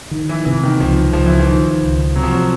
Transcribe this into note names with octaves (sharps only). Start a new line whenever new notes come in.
D#3
E3
C3 E3
D#3
C#2 F3
C#2 F3
E3
F3
D#3
C#2
C3 F#3
F3
F#3